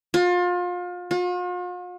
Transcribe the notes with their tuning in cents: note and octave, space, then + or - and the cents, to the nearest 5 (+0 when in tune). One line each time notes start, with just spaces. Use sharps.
F4 +30
F4 +45